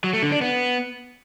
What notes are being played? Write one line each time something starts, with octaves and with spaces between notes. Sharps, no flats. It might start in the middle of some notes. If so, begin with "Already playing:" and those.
F#3
A3
D3
D4
B3